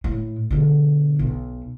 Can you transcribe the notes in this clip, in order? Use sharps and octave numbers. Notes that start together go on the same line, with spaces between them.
A2
B2 D3
B1